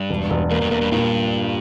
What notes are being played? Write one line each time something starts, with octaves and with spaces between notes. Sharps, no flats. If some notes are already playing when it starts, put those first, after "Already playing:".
Already playing: G2
E1
E1
E2 A#3
G2
E2 A#3
G2
G2 A#2